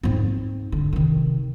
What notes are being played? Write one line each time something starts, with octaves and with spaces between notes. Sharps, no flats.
G#2 C4
D3
C3 D#3